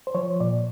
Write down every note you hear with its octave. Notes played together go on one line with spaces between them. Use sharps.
C5
F3 C#5
A#2 D5